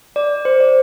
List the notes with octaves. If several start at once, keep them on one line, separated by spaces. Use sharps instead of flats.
D5
C5
D5